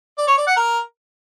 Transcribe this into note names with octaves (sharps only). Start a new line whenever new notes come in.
D5
C#5
D5
F#5
A#4